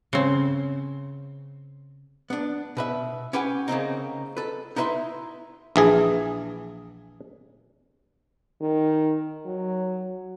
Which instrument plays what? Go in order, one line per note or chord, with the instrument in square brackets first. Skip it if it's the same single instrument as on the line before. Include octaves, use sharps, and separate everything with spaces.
[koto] C#3 C4
[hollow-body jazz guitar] B3 D4
B2 B4 E5
C#4 G4 B4 F#5 G#5
C#3 A#3 C4 D#4
A4 B4
D#4 E4 B4 E5 C6
[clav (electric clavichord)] A#1 E3 G#4
[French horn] D#3
F#3